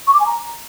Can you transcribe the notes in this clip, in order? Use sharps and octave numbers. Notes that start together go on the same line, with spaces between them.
C#6
D6
G#5
A#5